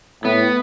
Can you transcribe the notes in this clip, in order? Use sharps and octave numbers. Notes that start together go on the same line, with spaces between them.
A2 B3